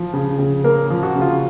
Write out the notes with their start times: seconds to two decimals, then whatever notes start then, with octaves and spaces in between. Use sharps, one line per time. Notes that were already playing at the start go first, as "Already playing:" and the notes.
Already playing: F3
0.13 C#3
0.39 C#3
0.64 A#3 A#4
0.90 F3
1.03 F#4
1.15 C#3
1.21 F4